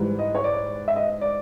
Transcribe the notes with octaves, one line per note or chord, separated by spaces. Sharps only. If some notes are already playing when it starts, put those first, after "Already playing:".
Already playing: G#2 E3 G3
D#5
C#5
D5
E5
D#5
D5